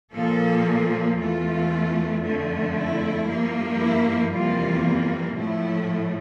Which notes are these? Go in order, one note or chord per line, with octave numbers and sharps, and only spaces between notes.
A#2 F3 A#3 A4
E2 E3 A3 F4
F2 D3 A3
E4
G2 F3 A#3
E4
F2 C3 E3 G3 A#3 F4
A2 F3 A3 E4